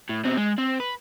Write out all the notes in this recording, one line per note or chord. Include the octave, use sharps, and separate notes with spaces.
A2
B2 C4
G#3
C4
B4